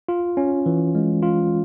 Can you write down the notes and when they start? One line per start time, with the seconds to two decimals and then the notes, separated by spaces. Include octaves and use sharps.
0.09 F4
0.37 C#4
0.66 E3
0.95 G#3
1.23 F4